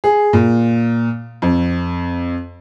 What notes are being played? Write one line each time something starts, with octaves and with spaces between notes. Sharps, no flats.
G#4
A#2
F2